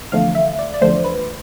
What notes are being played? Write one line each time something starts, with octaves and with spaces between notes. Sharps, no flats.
E2 D3 F3 A3 F5
E5
D5
D5
E2 D3 F3 A3 C5
B4